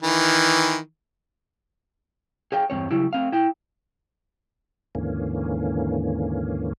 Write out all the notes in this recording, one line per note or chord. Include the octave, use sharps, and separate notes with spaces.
D#3 E3
G#4 C#5 F5 G5
E2 G2 C3 C4 C#5
C#3 F#3 G3 E4 G4
A3 C4 F5
E4 G5
D#2 G#2 D3 E3 A#3 C#4